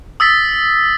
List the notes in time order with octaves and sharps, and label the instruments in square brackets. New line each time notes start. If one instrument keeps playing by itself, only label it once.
[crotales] D#6 E6 A6 B6